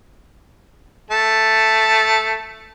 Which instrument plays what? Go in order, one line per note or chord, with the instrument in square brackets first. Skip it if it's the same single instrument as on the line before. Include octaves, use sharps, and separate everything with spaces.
[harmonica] A3 A5